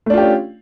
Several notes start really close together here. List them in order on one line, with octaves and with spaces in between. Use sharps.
A3 D4 F4 G4 C#4